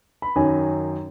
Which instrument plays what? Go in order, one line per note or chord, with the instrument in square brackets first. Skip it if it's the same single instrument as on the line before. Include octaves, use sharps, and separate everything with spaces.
[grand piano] B5
F#2 D#3 F#3 G#5